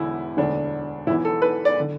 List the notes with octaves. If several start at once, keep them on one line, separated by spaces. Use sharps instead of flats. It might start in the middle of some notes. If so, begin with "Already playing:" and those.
Already playing: E1 E2 D3 E4
E1 D2 D3 D4
E1 E2 E3 E4
A4
B4
D5
D3